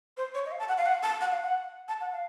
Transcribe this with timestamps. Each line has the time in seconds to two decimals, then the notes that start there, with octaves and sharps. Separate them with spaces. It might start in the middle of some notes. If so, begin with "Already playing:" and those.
0.17 C5
0.35 C#5
0.46 D#5
0.52 F5
0.59 A5
0.68 F#5
0.78 F5
0.86 F#5
1.03 A5
1.21 F#5
1.31 F5
1.43 F#5
1.88 A5
2.01 F#5
2.13 F5